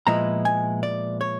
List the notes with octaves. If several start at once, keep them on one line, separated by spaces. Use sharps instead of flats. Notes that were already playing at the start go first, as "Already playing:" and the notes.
A#2 F3 G#3 B3 E4 A#5
G#5
D5
C#5